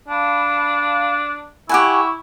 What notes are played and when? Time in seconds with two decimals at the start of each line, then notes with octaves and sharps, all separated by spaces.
0.08 D4 F5 A5 B5
1.69 E4 G4 F#5 G#5 C#6